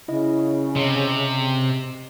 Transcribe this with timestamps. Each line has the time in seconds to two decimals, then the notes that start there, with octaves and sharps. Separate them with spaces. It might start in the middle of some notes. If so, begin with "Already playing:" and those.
0.08 C#3 E4 D#5
0.76 C3 D#5